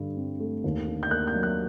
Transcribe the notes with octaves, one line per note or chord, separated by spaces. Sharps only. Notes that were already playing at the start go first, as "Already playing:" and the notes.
Already playing: G2 D3
C4
A3
D#2
D3
G6
A#3 F#6
G6
F#3
F#6